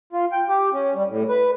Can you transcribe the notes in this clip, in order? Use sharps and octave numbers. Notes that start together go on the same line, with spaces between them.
F4
G5
G4
C#4
G3
A2
B4